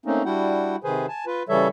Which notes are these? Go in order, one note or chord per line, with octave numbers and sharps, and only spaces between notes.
A3 A#3 C4 C#4 D#4
G3 D4 E4 F#4 F#5 G5
C3 D#3 G#4 B4 C5 G#5
G#5 A5
F4 B4
C#3 E3 G3 A4 C#5 E5